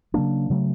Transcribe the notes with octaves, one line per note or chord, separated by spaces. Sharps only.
C#3 F#3 A#3 D4
C#3 F#3 A3